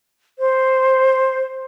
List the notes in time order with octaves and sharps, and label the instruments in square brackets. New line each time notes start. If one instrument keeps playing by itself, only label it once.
[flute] C5